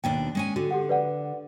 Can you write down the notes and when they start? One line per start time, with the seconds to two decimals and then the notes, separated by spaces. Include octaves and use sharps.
0.04 D#2 B2 D4 G5
0.35 G#3 C#4 G#5
0.56 D3 F#4
0.71 G4 A4 F#5
0.89 B4 D5 F#5